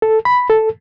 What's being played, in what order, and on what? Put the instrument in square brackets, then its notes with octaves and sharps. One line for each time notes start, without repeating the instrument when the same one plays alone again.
[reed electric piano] A4
B5
A4